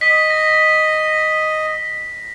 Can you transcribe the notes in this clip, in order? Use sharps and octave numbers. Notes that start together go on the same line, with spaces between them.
D#5 B6
A#6